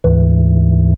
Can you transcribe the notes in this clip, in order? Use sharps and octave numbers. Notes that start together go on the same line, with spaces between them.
D2 G#2 E3